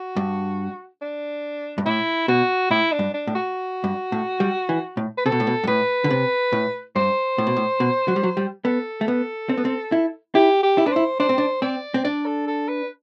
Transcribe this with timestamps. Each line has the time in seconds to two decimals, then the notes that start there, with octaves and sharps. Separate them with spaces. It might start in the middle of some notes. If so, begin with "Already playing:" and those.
Already playing: F#4
0.16 G2
1.01 D4
1.78 G2
1.86 A2 E4
2.28 B2 F#4
2.71 A2 E4
2.92 D4
2.99 G2
3.14 D4
3.27 A2
3.35 F#4
3.84 G2
4.12 A2
4.40 G3
4.69 E3
4.97 A2
5.17 B4
5.26 C3 A4
5.32 B2
5.40 A2
5.47 B2
5.64 G2
5.67 A2 B4
6.04 D3
6.10 C3
6.52 A2
6.96 G2 C5
7.38 A2
7.47 B2
7.56 A2
7.80 B2
8.08 F#3
8.16 G3
8.23 F#3
8.37 G3
8.65 B3 A4
9.01 A3
9.08 B3
9.49 C4
9.57 B3
9.65 C4
9.92 E4
10.35 E4 G4
10.63 G4
10.78 E4
10.86 D4 B4
10.91 E4 C5
11.20 D4 C5
11.29 C4
11.38 D4
11.62 C4 D5
11.94 C4
12.04 D4 D5
12.26 A4
12.47 A4
12.69 B4